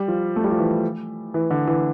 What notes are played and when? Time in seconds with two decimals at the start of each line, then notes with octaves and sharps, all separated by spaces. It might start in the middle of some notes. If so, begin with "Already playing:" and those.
Already playing: G3
0.08 F3
0.36 A3
0.44 G3
0.51 F3
0.59 E3
1.34 E3
1.50 D3
1.67 E3